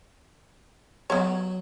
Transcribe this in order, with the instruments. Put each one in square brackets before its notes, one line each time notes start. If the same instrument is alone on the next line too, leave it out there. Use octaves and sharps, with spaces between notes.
[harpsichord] F#3 F#4 [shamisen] B3 C#5